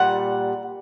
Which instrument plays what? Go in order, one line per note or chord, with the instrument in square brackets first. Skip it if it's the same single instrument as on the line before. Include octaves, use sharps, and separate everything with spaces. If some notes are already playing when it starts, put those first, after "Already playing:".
Already playing: [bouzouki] A#2 G3 F#5